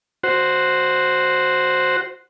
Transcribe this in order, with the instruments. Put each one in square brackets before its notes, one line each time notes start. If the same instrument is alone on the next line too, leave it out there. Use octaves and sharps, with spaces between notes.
[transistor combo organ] F#4 C5